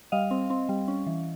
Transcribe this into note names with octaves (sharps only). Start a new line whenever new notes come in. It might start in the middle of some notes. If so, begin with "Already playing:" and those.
G3 D#5 F5
C4
C4
G3
C#4
E3